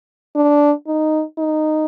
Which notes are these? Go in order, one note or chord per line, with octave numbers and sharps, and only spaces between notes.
D4
D#4
D#4